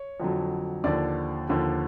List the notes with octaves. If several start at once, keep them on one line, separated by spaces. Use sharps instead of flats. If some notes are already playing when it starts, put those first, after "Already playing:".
Already playing: C#5
F2 D3 F#3
D#2 D3 F3 D5
D#2 D3 F3